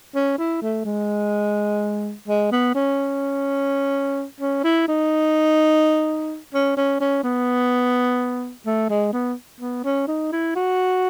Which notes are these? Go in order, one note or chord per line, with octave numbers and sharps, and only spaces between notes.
C#4
E4
A3
G#3
G#3
B3
C#4
C#4
E4
D#4
C#4
C#4
C#4
B3
A3
G#3
B3
B3
C#4
D#4
E4
F#4